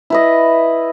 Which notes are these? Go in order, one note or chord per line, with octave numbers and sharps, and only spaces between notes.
E4 B4 D#5